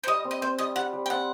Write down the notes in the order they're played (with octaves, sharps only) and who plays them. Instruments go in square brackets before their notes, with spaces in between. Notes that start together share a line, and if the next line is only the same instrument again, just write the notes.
[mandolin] C5
[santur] G3 [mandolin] D#5
[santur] C4
[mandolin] D#5
[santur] C4 [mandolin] C5
[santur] G3 [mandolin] D#5
[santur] G3 [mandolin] F#5
[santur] G3
[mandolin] G5
[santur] C4 [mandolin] F#5